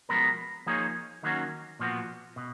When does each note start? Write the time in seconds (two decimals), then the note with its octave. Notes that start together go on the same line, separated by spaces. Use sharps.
0.09 F3 G#3 B3 F#4 A#4
0.66 F3 A#3 D#4 G#4 C#5
1.23 D#3 F#3 A#3 C#4 F#4
1.79 A#2 F3 B3 F#4
2.36 B2